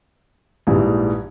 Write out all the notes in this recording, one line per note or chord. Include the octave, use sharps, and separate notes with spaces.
A#1 G#2 E3 G3